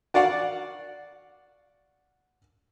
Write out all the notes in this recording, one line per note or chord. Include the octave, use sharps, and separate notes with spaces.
F#4 D5 F5 F#5